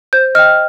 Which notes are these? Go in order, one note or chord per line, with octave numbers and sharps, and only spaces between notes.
C5 G6
D#5 G5 F6